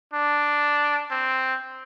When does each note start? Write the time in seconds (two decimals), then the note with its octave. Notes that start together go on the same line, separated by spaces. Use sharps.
0.14 D4
1.11 C4